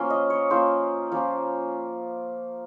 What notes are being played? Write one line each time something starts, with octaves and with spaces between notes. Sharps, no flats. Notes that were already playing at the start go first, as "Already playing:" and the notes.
Already playing: F3 A#3 C#4 F5 C6
D#5
C#5
F3 A#3 C#4 C5
F3 A#3 C#4